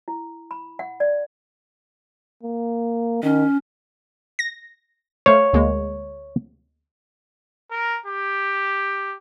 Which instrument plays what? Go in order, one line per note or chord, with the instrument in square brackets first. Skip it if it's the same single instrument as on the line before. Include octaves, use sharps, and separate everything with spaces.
[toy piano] E4
B5
F#5
D5
[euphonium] A#3
[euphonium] D#3 [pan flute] C#4
[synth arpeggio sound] A#6
[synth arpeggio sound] A3 C5 F5 [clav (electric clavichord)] C#5
[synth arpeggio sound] D2 G#3 A#3
[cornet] A#4
G4